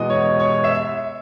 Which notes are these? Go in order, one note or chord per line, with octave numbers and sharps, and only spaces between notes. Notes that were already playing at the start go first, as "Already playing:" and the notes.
Already playing: E2 B2 G#3 B3 E4 D#5
C#5
C#5
E5